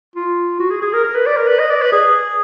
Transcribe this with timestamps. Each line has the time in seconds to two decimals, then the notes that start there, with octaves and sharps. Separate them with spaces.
0.16 F4
0.60 F#4
0.71 G#4
0.82 G#4
0.93 A#4
1.04 A#4
1.15 B4
1.27 D5
1.37 A#4
1.48 B4
1.59 D#5
1.70 D5
1.82 B4
1.92 G#4